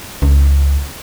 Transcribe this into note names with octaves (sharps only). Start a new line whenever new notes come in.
C#2